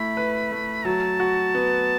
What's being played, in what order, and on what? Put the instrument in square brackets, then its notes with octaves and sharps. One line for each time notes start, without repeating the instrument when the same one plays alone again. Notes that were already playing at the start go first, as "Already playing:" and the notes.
Already playing: [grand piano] A3 E4 [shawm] B5
[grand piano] B4
A3
[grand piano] F#3 [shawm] A5
[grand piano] F#4
B3